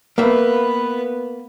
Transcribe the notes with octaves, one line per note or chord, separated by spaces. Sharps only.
A#3 B3 B4 E5